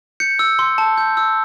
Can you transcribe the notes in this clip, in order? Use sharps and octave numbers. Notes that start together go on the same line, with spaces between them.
G6 C#7
E6
C6
A5
G6
E6